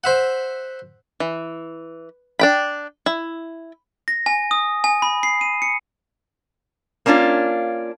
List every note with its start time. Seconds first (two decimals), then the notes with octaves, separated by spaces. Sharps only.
0.04 C5 E5 F#5
1.20 E3
2.39 D4 G5 B5
3.06 E4
4.08 A#6
4.26 G#5
4.51 D#6
4.84 G#5
5.02 B5
5.23 C7
5.41 D#7
5.62 C#7
7.06 A#3 C#4 D4 E4 F4